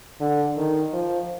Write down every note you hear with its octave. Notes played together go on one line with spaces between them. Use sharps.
D3
D#3
F3